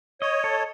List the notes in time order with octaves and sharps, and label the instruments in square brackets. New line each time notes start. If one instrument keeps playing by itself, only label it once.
[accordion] C#5 [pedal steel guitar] D#5
[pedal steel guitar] A4